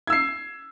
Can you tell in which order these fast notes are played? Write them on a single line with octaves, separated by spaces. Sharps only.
G#6 E6 C7